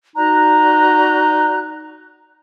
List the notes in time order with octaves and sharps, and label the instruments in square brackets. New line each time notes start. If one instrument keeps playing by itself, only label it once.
[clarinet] D#4 [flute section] F#4 D5 F#6 [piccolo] A#5